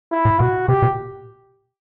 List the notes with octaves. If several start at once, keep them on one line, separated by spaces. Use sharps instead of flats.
E4
A#2
B2 F#4
C3 G4
B2